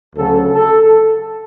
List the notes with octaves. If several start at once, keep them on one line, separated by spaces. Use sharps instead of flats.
D2 C#3 F#3 A4
A4